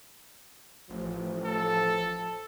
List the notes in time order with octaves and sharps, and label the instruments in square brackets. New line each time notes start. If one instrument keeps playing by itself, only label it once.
[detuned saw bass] A1 [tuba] F3
[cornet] A4